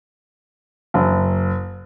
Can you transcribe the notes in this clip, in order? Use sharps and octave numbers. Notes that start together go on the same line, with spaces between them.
F#1